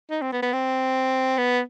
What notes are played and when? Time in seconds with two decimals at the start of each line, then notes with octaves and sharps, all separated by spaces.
0.11 D#4
0.22 C4
0.32 B3
0.42 B3
0.53 C4
1.38 B3